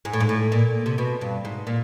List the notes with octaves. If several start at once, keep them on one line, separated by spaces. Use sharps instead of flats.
G#2
A2
G#2
A2
A#2
C3
B2
G2
G#2
A#2